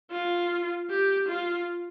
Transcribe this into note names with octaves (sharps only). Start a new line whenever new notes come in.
F4
G4
F4